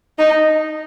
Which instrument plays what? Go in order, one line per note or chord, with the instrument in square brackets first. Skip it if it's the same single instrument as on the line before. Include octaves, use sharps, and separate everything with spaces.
[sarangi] D#4